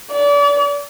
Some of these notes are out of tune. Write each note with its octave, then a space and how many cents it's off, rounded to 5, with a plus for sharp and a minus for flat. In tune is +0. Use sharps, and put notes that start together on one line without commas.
D5 -35